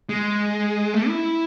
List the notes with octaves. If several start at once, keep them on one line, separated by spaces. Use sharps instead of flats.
G#3
A3
E4